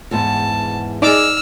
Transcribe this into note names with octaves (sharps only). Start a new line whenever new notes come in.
E2 G#2 B3 A5
D#4 G#4 D5 D#5 D6 E6 F6